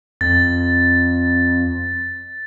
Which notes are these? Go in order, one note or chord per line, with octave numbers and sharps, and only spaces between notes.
F2 A6